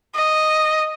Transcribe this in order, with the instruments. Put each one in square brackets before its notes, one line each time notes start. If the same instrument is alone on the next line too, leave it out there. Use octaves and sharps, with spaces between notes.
[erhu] D#5